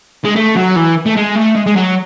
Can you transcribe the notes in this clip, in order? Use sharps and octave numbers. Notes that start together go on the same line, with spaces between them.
G#3
A3
F#3
E3
A3
G#3
A3
G#3
G#3
F#3